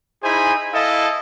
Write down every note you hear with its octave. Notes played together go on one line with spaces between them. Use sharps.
D#4 E4 G#4 C5 G#5 B5
E4 A4 D#5 F5 A5